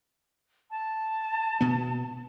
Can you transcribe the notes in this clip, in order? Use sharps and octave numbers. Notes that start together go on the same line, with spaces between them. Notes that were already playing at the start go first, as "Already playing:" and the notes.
A5
B2 B3